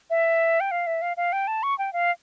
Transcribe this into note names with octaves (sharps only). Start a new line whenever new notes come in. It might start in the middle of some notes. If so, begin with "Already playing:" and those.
E5
G5
F5
E5
F5
F5
G5
A5
C#6
G5
F5